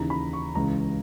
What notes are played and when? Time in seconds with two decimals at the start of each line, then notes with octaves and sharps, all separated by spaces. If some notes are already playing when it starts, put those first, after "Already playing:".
Already playing: D#2 C#3 E3 A#5
0.10 B5
0.33 C#6
0.55 C#2 C#3 E3 A#5